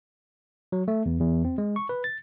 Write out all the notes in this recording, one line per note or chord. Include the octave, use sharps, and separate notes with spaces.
F#3
A3
E2
E2
C4
G#3
C#6
B4
A6